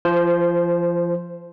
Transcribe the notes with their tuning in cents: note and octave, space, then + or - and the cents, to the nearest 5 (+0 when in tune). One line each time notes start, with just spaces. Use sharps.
F3 -30 C5 +0